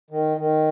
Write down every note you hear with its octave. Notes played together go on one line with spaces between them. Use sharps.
D#3
D#3